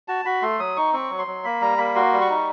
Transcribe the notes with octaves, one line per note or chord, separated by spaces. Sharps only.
F#4 A5
F#4 B5
A3 C6
F#3 D#6
D#4 C#6
C4 C#6
F#3
C6
F#3
A#3 B5
G3 A#5
A#3 B5
F#4 C6
G3
C#6
D#4